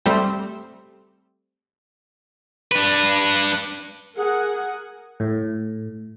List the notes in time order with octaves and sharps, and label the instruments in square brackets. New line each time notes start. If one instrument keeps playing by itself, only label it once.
[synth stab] G3 A3 C4
[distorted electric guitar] D4 B4
[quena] G#4 [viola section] A#4 F#5 G#5
[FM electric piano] A2